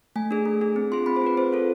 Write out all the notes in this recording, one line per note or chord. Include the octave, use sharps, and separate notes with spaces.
A3 G#5
D4 G#4
A3
D4 G#4
C4
F4 G#4 C6
C4 B5
C5
F4 G#4 B4
C4 C5
F4 A4